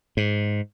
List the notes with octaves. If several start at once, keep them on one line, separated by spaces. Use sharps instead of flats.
G#2